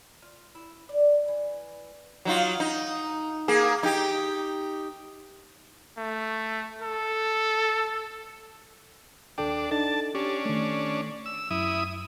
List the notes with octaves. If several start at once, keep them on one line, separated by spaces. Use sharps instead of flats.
F4
E4
D5
E3
F#3 D#4 F4
D#4
A#3 G#4
D#4 G4
A3
A4
D#2 D4 A4 G5
D4 D#4 A4 A5
C#4 D4 G4
D#3 A3
E6
F#2 E4 D#6